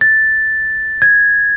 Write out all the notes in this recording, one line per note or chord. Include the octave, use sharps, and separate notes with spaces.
A6
G#6